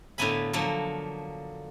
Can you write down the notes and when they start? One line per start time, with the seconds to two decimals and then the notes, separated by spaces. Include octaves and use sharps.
0.18 A2 D3 A#3 B3 G#5 B5
0.53 D3 F3 F#3 A#3